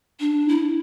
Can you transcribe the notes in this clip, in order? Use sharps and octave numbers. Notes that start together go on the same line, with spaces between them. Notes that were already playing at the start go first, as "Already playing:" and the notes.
D4
E4